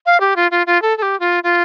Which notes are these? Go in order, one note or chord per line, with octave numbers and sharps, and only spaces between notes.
F5
G4
F4
F4
F4
A4
A4
G4
F4
F4